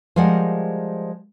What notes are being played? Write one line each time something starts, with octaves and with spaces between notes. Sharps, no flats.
F3 G3 G#3 A#4 F#5